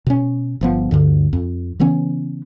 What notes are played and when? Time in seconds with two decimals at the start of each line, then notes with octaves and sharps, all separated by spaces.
0.07 B2 C#4
0.61 G1 F3 B3
0.91 D2 G2 D3
1.33 F2
1.80 C#3 E3 B3 C#4